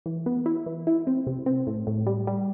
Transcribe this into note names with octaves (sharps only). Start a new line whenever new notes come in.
E3
B3
E4
E3
E4
C4
C3
C4
A2
A2
G3
G3